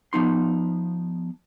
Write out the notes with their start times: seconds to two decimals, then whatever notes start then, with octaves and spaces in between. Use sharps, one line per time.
0.13 F3 B3 D#4 C6